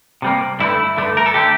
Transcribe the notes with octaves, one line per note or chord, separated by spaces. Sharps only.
C3 G3 A#3
G2 D3 A3 E4
G2 D3 A3
A#4
A4
D3 A3 G4